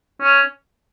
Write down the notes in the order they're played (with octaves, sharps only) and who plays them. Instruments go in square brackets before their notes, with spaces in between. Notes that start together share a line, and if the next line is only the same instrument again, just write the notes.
[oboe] C#4